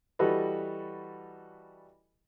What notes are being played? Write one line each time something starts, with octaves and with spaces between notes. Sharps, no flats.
E3 G3 F#4 A4 B4 D#5